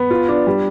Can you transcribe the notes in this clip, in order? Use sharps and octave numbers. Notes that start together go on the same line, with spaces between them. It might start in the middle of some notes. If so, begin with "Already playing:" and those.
Already playing: B3
F4
D4
G3